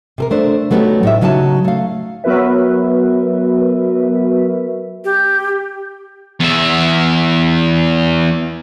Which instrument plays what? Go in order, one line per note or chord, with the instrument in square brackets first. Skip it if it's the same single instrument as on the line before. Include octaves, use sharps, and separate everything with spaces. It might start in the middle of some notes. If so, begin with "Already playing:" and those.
[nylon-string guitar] C3 A4 A#4
A3 D4 C5
F#3 A3 B3 C#4 D#4 G4
A2 D#4 E5
C#3 F#3 D#4 G#5 A5
A3 F5
[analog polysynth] F#3 B3 F#4 A#4 B4 E5
[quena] G4
[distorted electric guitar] E2 E5